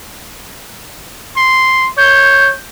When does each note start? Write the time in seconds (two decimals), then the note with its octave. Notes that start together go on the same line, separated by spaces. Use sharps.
1.37 C6
1.97 C#5 G6